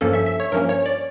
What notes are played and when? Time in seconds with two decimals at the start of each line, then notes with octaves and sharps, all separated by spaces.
0.01 G2 F3 A#3 C#4 A4
0.13 E5
0.26 E5
0.40 C#5
0.52 G2 F3 A#3 C#4 A#4
0.69 C#5
0.86 D5